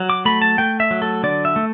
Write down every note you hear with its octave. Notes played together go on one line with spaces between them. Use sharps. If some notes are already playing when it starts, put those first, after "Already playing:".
Already playing: F#3
D6
A3 B5
A5
A3 G5
E5
F#3
A4
D3 D5
E5
A3